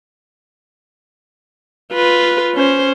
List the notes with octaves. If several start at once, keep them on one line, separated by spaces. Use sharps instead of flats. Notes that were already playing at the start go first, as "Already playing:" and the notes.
F4 B4
C#4 C5